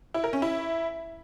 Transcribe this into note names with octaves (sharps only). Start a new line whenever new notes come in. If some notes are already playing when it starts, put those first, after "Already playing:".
E4
A#4
C#4
E4